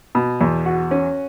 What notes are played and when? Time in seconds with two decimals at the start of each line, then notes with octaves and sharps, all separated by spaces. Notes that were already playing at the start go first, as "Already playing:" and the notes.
0.15 B2
0.41 E2
0.66 F#4
0.91 C#4